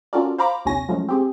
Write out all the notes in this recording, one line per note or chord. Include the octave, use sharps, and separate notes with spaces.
C#4 F4 F#4 A4 A#4 D5
C5 F5 A#5 B5 D6
A#1 D#2 C3 C#5 G#5 A#6
F3 F#3 G#3 A3 C#4
C4 G4 G#4